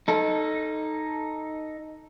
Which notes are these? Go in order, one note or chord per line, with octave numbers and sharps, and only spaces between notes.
D#4 A4